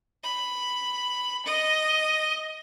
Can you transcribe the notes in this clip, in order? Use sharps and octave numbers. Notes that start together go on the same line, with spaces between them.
B5
D#5